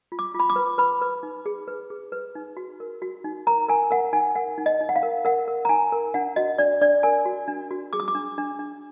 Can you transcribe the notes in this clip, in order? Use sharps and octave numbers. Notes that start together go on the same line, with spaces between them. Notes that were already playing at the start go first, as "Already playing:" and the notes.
F4
D6
F4 B5
D6
B4
B4 B5
B4
D#4
G#4
B4
G#4
B4
D#4
F#4
A#4
F#4
D#4
A#4 A#5
A#4 G#5
A#4 F#5
D#4 G#5
A#4 F#5
D#4
D#5
D#4
F#5
F5
A#4
A#4 F#5
A#4
A#5
D#4 G#5
A#4
D4 F#5
F#4 D#5
D4 D5
D4 D5
A#4 G#5
F#4
D4
F#4
G#4 D6
D#6
D6
D4
D4
D4